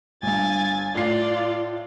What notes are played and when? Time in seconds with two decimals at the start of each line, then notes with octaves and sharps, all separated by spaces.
0.23 G1 G2 G#5 A6
0.95 A2 F4 D5 C7